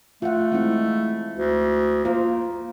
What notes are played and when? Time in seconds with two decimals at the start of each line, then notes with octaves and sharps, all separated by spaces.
0.22 A3 F4 F#5
0.52 G#3 C4 E4
1.37 D2
2.05 A#3 F4 C5